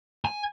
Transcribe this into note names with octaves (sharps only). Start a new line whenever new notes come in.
G#5